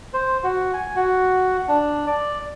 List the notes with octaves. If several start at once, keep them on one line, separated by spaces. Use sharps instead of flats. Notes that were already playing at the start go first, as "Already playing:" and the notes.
C5
F#4
G#5
F#4
D4
D5